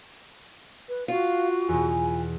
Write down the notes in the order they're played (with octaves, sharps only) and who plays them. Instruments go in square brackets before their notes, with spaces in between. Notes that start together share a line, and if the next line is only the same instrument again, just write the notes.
[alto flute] B4
[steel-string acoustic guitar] F4 [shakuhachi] F#4 [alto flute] F5
[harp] E2 B2 [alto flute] G#5